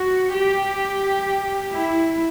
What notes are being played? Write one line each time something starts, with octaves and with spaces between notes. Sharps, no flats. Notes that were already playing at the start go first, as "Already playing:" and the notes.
Already playing: F#4
G4
E4